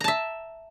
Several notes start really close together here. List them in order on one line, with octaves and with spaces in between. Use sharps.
A#5 A5 E5